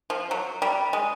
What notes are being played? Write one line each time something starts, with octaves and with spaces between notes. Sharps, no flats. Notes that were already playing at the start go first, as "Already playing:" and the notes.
F3
F#3
G3
G#3